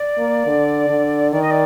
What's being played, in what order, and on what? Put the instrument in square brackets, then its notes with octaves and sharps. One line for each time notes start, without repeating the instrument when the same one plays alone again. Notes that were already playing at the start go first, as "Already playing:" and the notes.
Already playing: [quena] D5
[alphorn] A#3
D3
D3
[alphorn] D#3 [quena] D5
[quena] D#5
D5